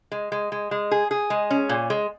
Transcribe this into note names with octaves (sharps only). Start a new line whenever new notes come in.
G#3
G#3
G#3
G#3
G#4
G#4
G#3
C#4
A#2
G#3